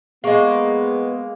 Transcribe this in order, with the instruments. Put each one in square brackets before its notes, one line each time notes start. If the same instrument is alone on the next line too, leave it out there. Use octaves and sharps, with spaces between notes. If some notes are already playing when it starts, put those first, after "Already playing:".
[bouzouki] G#3 A#3 [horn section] B3 [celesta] G#4 C#6